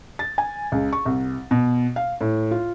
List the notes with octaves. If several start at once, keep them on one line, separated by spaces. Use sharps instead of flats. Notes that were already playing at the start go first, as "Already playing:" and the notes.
A6
G#5
C#2
C#6
C2
B2
F5
A2
F4